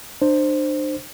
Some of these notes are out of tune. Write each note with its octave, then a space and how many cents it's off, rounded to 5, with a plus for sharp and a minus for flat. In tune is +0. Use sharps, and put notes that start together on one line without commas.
D4 +35 C5 +5